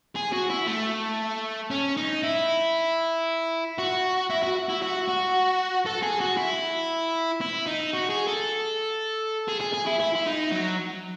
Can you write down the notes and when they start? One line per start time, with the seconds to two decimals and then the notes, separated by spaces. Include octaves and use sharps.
0.16 G#4
0.33 F#4
0.50 E4
0.67 A3
1.70 C#4
1.97 D#4
2.23 E4
3.78 F#4
4.30 E4
4.43 F#4
4.69 E4
4.82 F#4
5.08 F#4
5.86 A4
6.02 G#4
6.21 F#4
6.37 E4
7.41 E4
7.66 D#4
7.93 F#4
8.10 G#4
8.28 A4
9.48 G#4
9.61 G#4
9.74 G#4
9.87 E4
10.00 E4
10.16 E4
10.26 D#4
10.52 F#3